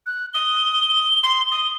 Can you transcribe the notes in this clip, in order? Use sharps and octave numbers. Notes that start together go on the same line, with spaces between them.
F#6
D#6 G7
C6
D#6